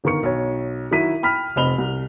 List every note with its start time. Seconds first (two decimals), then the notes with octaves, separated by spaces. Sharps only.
0.04 G1 D#3 A#4 C#6 C#7
0.23 B1 C#5
0.91 D#3 F#3 E4 F#4 B6 D#7
1.23 G5 B5 F6 B6
1.56 F1 C4 D#5 B5 F7 G7
1.78 C2